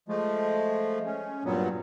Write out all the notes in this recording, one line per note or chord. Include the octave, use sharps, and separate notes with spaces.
F3 G#3 A3
C#4
G2 A#2 F#3 B3